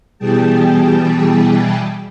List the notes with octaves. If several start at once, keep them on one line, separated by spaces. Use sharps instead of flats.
B2 E3 G3 G#4 G5 A5